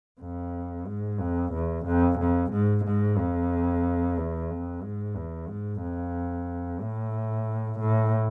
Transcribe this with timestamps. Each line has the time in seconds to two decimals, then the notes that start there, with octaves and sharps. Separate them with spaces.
0.21 F2
0.87 G#2
1.20 F2
1.54 E2
1.86 F2
2.19 F2
2.52 G#2
2.85 G#2
3.18 F2
4.17 E2
4.50 F2
4.83 G#2
5.16 E2
5.48 G#2
5.82 F2
6.81 A2
7.80 A2